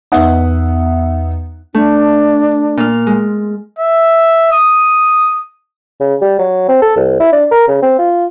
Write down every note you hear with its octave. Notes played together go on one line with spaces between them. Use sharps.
E2 B3 D#4 E5 F#5 D#6
A3 D4
A#2 F6
G#3
E5
D#6
C#3
G3
F#3
C4
A4
C2
E4
D4
A#4
C#3
C4
F4